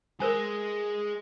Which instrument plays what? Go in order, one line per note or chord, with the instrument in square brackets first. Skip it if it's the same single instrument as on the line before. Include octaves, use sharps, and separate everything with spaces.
[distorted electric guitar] G#3 [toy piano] A#4 C5 G#5